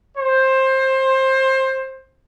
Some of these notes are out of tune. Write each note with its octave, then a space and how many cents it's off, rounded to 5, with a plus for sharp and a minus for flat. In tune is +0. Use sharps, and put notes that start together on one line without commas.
C5 +20